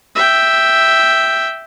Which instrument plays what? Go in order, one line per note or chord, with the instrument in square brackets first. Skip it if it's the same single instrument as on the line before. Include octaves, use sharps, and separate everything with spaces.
[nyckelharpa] E5 G5